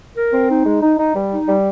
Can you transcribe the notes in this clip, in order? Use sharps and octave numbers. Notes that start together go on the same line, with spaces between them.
A#4
C4
D#4
G#3
D#4
D#4
G3
D#4
G3